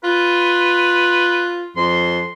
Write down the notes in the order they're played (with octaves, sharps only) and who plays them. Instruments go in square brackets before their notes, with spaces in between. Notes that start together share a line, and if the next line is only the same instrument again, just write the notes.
[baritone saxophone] F4 [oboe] B4
[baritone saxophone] F2 [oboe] C6